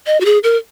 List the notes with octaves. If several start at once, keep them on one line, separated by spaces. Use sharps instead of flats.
D#5
F#4
G#4
A#4